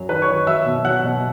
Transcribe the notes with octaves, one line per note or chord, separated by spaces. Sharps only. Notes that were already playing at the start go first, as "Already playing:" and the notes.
Already playing: F#2 F#3
D#3 B4 B5
C#5 C#6
D#3
F#3 E5 E6
B2
F#3 F#5 F#6
B2